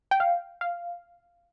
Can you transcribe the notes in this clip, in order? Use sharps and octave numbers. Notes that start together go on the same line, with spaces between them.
G5
F5
F5